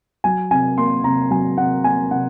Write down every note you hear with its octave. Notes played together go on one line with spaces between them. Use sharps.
F#3 G#5
C3 G#5
A#3 C6
C3 A#5
F#3 G#5
C3 F#5
A#3 G#5
C3 F#5